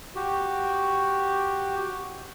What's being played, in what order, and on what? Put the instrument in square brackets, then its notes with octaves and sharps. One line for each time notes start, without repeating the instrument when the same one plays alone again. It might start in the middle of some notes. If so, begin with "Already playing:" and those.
[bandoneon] F#4 G4